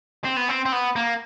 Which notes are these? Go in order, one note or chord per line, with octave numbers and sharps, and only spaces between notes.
C4
B3
C4
C4
B3
A#3